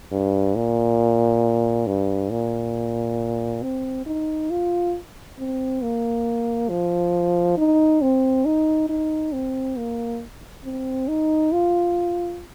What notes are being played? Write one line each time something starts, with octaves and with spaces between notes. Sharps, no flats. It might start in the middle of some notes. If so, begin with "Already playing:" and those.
G2
A#2
G2
A#2
C4
D#4
F4
C4
A#3
F3
D#4
C4
D#4
D#4
C4
A#3
C4
D#4
F4